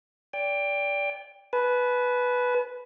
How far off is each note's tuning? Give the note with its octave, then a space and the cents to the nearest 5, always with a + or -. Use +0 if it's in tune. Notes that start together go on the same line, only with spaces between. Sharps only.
D5 -25 G5 +20
B4 +0 A5 -45